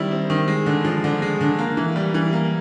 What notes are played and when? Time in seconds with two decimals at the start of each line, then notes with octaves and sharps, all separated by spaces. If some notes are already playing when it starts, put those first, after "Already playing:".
Already playing: D#3 G3 C4 E4
0.11 C4
0.30 D#3
0.48 G#3
0.66 D3
0.85 F3
1.04 D3
1.22 G#3
1.41 D3
1.59 A#3
1.77 E3
1.96 G3
2.14 E3
2.33 A#3